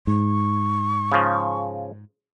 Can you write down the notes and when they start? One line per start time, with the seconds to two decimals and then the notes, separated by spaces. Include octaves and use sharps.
0.07 G#2 C#6
1.12 C#3 F3